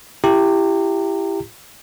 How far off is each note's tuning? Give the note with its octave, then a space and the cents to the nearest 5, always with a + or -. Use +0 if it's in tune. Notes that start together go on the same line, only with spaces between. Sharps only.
E4 +25 G4 +5 A#5 -35